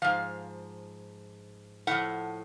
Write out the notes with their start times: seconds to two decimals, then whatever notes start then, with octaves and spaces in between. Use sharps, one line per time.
0.02 G#2 F3 F5
1.87 A2 F3 F#5